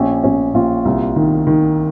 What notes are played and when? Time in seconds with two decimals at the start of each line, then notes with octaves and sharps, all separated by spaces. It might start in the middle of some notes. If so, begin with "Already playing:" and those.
Already playing: A#1 C#4
0.24 A#1 C#4
0.54 A#1 F4
0.85 C2
1.16 D#3
1.47 D#3